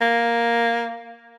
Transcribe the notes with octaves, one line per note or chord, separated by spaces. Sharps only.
A#3